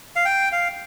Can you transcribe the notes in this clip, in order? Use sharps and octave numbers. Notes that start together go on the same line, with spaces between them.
F5
G5
F5